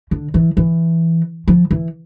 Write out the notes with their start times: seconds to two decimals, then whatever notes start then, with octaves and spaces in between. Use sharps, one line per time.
0.11 D3
0.34 E3
0.57 E3
1.48 F3
1.71 E3